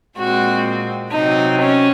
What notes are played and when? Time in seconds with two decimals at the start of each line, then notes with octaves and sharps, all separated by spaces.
0.17 A#2 G#3 C4 F#4
1.11 C3 F#3 C4 D#4
1.60 C#4